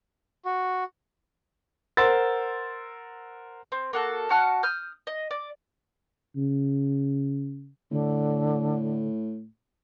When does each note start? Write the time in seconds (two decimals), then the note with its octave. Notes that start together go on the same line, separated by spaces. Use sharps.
0.45 F#4
1.97 A#4 C5 F#5 C6 E6 A6
3.72 C4
3.93 A#3 F#4 A4
4.30 F#4 F#5 A5 F6
4.63 D#6 F6 G6
5.07 D#5
5.31 D5
6.36 C#3
7.91 A2 D3